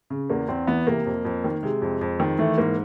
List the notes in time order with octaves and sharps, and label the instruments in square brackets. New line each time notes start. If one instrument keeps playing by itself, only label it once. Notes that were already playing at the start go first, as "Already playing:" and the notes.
[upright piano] C#3
E2 A#3
E2 C4
E3 B3
C3 A#3
F2
F2
D#3
C3 G#3
F2
F2
D#3
E3 A3
G#2 A#3